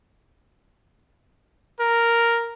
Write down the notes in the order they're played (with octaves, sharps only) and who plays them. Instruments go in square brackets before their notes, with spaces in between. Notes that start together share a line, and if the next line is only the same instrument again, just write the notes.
[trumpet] A#4